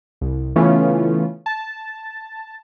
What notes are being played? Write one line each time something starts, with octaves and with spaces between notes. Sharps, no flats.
C2
C#3 E3 A3 B3 C#4 F4
A5